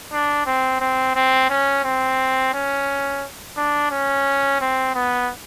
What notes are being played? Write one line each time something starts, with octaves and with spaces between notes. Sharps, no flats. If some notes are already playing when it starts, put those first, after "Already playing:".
D4
C4
C4
C4
C#4
C4
C#4
D4
C#4
C4
B3